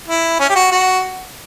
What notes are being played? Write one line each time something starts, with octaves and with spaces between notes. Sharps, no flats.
E4
C#4
G4
F#4
F#4